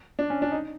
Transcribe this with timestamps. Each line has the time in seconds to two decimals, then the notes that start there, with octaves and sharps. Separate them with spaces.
0.19 D4
0.30 C#4
0.42 D4
0.52 D#4